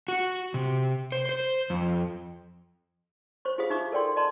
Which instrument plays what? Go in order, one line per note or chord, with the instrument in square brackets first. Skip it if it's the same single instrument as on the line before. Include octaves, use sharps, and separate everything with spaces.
[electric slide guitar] F#4
C3
C5
C5
F2
[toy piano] C5 C#6
F4 G4 G#4 C5 F5 D#6
D#4 E5 A#5 C#6 D6
A4 A#4 D5 G5 C6
D5 D#5 A5 A#5 C6